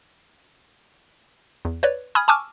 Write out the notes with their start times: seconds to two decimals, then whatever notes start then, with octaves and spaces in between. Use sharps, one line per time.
1.65 E2
1.83 B4 C#5 D5
2.15 G#5 B5 D#6 F6 G#6
2.28 G#5 A5 C#6 D6 E6 F6